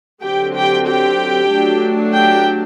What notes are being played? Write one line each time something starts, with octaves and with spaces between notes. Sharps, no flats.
D3 F#3 C4 G4 G5
G4 G5
G4 G5
F#3 A3 D4
G4 G5